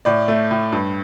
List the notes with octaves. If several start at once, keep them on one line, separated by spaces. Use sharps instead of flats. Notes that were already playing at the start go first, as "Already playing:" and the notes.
A2 D5
A3
A2
G2